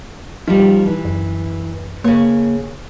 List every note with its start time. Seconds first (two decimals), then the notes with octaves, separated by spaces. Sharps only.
0.48 F3 G3 D#4
0.86 E3
1.05 F#2
2.04 C#3 A#3 C#5